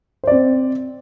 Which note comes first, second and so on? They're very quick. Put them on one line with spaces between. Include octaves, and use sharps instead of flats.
C5 D5 C4